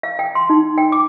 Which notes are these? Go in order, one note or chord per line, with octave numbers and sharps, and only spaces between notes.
F5
G5
C6
D#4
G5
D6